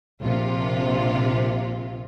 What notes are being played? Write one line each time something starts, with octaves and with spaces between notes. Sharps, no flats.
A#1 C3 F4